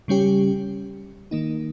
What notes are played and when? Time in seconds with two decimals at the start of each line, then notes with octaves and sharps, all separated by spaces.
0.08 C#3 G3 C#4 G4
1.31 D#3 A#3 D#4